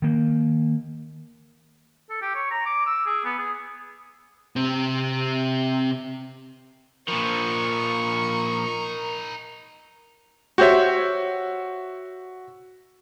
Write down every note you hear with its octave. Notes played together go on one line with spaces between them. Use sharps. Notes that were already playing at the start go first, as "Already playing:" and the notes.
D#3 A#3
A4
G4
C#5
A#5
D6
E6
G#4
B3
G#4
C3 C4
A#2 F3 D#4 A#4 B4 C#6
F#4 G4 C5 C#5 E5